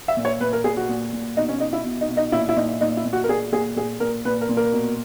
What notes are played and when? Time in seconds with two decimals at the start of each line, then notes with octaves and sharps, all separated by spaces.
0.08 E5
0.17 A#2
0.25 C#5
0.41 A#2 B4
0.53 A#4
0.64 A#2 G#4
0.77 F#4
0.89 A#2
1.13 A#2
1.37 B2 D#4
1.49 C#4
1.60 B2 D#4
1.73 E4
1.84 B2
2.01 D#4
2.09 B2
2.17 D#4
2.32 A#2 E4
2.49 E4
2.57 A#2 D#4
2.81 A#2 D#4
2.97 E4
3.05 A#2
3.13 F#4
3.24 A#4
3.29 A#2 G#4
3.52 A#2 G#4
3.76 A#2 G#4
4.00 A#2 A#4
4.25 A#2 B4
4.41 A#4
4.49 A#2
4.57 A#4
4.72 B2